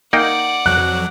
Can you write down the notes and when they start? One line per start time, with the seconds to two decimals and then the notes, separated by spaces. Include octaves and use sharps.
0.13 A#3 D#4 D5 F#5 G5
0.66 F2 F#3 F#6